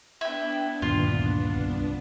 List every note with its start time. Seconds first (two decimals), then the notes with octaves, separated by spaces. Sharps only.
0.21 B3 D4 E4 G5
0.82 D2 G2 A#2 D#3 F4
1.55 C2